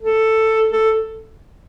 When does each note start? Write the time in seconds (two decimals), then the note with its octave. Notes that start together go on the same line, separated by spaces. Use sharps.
0.01 A4
0.72 A4